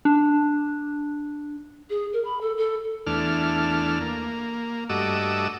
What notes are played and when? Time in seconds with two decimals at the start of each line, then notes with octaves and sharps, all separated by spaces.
0.05 D4
1.90 G#4
2.13 A#4
2.25 B5
2.41 A4
2.57 A4
3.06 E2 A3 D4 F6
4.01 A#3
4.89 G2 A3 F#4 D#5 D6 E6